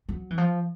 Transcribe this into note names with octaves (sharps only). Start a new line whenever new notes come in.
F#3
E3
F3